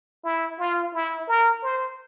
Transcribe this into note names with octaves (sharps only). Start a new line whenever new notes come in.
E4
F4
E4
A#4
C5